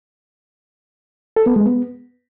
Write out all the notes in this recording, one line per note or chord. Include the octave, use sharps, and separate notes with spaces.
A4
B3
G#3
B3